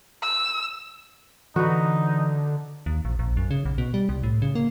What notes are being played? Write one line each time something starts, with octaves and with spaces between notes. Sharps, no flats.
E6
D3 E3 D#4 F#4 B4
D#2
A#1
A#1
F#2
C#3
B1
B2
G3
C2
A2
C#3
A#3